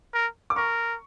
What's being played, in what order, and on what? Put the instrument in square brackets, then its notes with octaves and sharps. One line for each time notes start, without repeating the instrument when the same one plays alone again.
[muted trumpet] A#4
[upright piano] D6
[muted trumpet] A#4 [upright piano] C#6